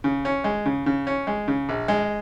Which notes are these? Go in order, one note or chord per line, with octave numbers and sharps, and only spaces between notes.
C#3
C#4
G#3
C#3
C#3
C#4
G#3
C#3
A#1
G#3